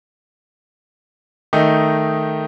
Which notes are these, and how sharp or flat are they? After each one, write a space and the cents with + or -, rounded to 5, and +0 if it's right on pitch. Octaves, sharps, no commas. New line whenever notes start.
D#3 +0 A3 +0 D#4 +0